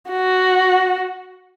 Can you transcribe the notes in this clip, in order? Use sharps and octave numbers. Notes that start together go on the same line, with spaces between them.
F#4